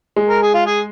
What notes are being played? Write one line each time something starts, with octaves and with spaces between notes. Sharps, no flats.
G#3
A#4
G#4
F4
G#4